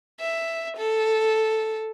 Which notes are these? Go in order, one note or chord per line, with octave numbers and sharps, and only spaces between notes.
E5
A4